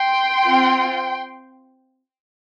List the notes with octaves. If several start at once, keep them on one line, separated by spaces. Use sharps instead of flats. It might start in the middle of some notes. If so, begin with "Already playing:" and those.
Already playing: G5 C6
C4 F4